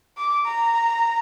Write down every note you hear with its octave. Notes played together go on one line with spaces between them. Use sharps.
D6
A#5